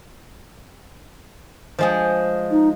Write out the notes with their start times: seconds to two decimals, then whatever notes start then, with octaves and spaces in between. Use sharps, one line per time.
1.79 F3 G#3 G#4
2.51 D#4